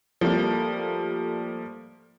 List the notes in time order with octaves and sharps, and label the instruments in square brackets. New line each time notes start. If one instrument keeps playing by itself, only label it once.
[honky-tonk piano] F3 G3 A3 A#3